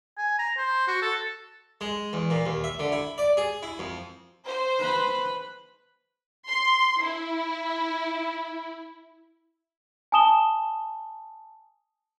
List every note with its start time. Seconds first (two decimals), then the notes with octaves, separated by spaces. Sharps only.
0.18 G#5
0.39 A#5
0.57 C5
0.87 F#4
1.02 A4
1.81 G#3
2.13 E2
2.30 A#2
2.46 D#2
2.64 E5
2.79 D3
2.92 E4
3.18 D5
3.37 G#4
3.63 E4
3.79 F2
4.44 C5
4.79 B4 B5
6.48 C6
7.02 E4
10.12 G#5 A5 D#6 E7 G7